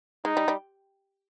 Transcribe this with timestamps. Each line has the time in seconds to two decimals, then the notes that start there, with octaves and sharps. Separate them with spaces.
0.25 G#3 D#4
0.37 G3
0.48 G3